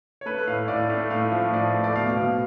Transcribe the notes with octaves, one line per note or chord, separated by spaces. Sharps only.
C#5
A3 B4
A2 F5
A2 D5
A3 F5
A2 F5
F3
A2 D5
A3
D5
B2 F5
B2